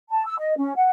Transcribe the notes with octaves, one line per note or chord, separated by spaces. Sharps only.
A5
E6
D#5
C#4
F#5